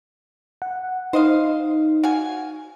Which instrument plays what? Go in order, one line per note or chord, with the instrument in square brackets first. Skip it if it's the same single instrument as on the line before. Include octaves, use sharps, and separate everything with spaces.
[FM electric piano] F#5
[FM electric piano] D#4 [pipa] C5 D#5 F5
[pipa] F#4 F5 G#5